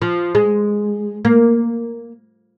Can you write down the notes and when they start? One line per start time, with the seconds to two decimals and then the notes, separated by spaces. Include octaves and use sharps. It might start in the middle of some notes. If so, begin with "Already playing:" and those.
0.02 F3
0.35 G#3
1.25 A#3